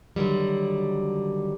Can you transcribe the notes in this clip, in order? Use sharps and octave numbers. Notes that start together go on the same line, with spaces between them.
D3 D#3 F#3 G3